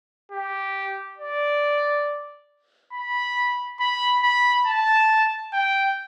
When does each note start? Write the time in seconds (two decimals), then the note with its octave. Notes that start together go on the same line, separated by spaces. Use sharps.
0.32 G4
1.18 D5
2.93 B5
3.80 B5
4.23 B5
4.67 A5
5.53 G5